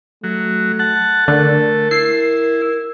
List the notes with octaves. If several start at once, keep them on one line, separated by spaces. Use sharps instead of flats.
F#3 A3
F#5 A5
D3 A3 A#4
E4 C7